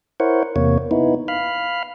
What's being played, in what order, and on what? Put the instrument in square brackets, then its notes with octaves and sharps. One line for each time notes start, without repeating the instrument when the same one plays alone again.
[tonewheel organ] E4 A#4 C5 C#5 F#5
E2 C3 A#3 C#5
B3 D#4 E4
F5 B5 F6